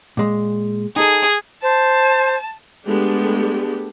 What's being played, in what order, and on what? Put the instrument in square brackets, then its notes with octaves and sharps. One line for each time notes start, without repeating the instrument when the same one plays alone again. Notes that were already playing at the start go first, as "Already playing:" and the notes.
[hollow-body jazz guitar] A#2 G#3
[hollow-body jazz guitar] D#4 A4 [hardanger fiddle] G#4
[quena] C5 [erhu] A5
[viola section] G#3 A3 B3 D4 G4 A4